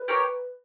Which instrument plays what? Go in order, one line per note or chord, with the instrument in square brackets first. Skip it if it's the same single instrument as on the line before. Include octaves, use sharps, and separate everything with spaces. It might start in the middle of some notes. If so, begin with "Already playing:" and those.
Already playing: [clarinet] B4
[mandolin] G4 A#4 C#5